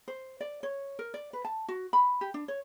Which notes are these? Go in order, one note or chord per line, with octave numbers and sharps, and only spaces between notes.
C5
D5
C#5
A#4
D5
B4
A5
F#4
B5
G4
D4
C#5